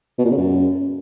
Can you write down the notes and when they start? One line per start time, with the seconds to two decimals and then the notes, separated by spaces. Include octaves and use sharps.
0.19 B2
0.25 A#2
0.31 C#3
0.38 F#2